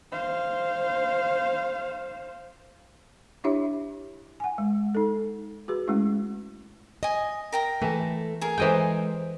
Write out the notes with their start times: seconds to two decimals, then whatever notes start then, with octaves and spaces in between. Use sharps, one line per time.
0.12 C5 F5
3.44 D4 E4 G4 C#5 E5 B5
4.40 F#5 G#5
4.58 G#3
4.95 D#4 A4
5.68 F#4 G#4 B4
5.88 G#3 A3 C#4 E4
7.03 D#5 G#5 D#6
7.52 A#4 G5 A#5
7.82 E3 A3 A4
8.41 G#4 A#4
8.58 E3 G#3 A4 C5 D#5 G5